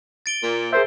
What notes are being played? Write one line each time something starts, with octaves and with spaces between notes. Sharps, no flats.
A6 D7 G7
A#2
G#4 A#4 C5 E5